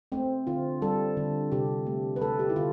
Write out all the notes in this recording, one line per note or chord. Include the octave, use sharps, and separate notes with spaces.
A3 C4
D3 F4
G3 A4
D3
C3 G4
A3
B4
A3 A4
G4
E4
D3 F4